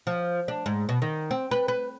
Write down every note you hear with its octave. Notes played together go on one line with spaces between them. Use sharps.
F3
D4
G#2
B2
D#3
C4
B4
B4